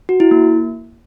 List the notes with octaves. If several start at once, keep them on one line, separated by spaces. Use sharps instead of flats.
F#4
E4
A#3